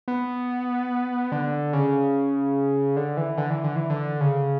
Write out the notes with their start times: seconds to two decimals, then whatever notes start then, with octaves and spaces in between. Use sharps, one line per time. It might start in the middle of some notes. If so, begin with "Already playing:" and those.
0.08 B3
1.32 D3
1.73 C#3
2.97 D3
3.17 E3
3.38 D3
3.50 E3
3.64 D3
3.76 E3
3.90 D3
4.20 C#3